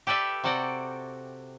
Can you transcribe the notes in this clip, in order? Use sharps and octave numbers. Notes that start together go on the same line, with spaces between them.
G4 A4 B4 D5 E5
C3 F#4 A4 D5 F#5 G5